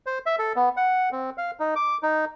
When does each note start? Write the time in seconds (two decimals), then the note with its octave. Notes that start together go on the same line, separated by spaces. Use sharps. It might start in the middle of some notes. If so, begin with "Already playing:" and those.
0.06 C5
0.26 E5
0.39 A4
0.56 B3
0.77 F#5
1.12 C4
1.38 F5
1.60 D#4
1.76 D6
2.03 D#4